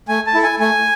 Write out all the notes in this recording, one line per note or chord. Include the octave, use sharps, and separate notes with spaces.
A3 G#5
A5
E4 A4
G#5
A3 G#5